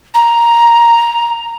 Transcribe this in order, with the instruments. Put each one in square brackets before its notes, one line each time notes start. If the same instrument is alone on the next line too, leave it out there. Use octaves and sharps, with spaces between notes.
[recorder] A#5